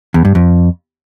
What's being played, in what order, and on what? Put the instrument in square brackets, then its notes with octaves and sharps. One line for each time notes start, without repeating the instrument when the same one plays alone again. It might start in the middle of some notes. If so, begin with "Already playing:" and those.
[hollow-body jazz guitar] E2
G2
F2